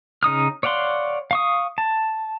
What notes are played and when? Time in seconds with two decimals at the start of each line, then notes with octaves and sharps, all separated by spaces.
0.23 C#3 D#4 D#6 F6
0.63 C#5 D5 F5 F#5 C6
1.31 F5 C#6 D#6
1.78 A5